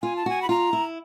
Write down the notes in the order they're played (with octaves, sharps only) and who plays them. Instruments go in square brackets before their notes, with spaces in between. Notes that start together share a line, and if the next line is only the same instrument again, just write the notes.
[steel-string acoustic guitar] F4 [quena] G#5
[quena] A5
[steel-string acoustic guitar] F#4 [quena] G#5
[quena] B5
[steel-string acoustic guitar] F4 [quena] A#5
[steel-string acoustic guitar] E4